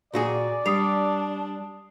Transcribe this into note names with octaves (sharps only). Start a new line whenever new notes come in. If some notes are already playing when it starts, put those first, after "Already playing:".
A#2 F#4 G#4 D5
G3 D4 D#6 C7 F7